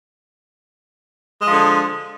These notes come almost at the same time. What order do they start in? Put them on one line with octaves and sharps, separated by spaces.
G#3 F3 D3